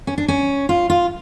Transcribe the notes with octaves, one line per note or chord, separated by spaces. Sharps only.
C#4
D4
C#4
F4
F4